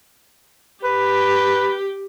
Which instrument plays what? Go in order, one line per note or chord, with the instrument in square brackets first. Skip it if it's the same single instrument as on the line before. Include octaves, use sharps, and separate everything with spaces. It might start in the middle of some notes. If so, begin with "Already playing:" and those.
[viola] G4 [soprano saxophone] B4